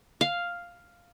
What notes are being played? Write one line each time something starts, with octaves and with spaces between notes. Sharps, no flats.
F5